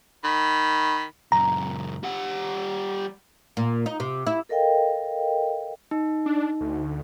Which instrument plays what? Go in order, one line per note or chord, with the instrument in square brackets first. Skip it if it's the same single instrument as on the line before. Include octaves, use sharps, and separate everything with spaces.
[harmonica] D#3 B5
[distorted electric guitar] C#2 F#2 [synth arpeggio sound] A#5
[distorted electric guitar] G3 F#5
[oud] A#2
D#4
C3
E4
[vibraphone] A4 A#4 D#5 F5 G5
[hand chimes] D#4
[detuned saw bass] D4
D2